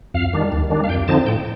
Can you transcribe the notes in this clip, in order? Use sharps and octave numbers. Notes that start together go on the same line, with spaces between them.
F2 F5
D#3 G3 D4
D#2
D#3 G3 D4
F5
F2 G5
D3 F3 C4 D#4 A5
A2 G5